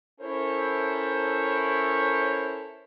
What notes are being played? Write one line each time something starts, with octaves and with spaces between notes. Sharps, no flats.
C#4 E4 A4 A#4 C5 C#5